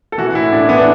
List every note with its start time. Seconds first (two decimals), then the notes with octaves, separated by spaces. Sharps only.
0.12 A4
0.18 E3 F#4
0.35 A2 E4
0.52 A2 D4
0.69 E3 B3
0.77 D4